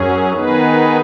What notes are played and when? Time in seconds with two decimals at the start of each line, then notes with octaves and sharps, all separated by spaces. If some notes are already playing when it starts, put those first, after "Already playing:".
Already playing: F#2 F#3 C#4 G#4
0.33 D#3 B3 D#4 G#4 B4